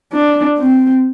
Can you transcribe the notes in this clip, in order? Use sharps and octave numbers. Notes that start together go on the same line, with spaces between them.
D4
C4